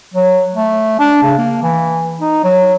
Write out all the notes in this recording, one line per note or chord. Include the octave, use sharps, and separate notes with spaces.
F#3
A3
D4
C#3
A#3
E3
D#4
F#3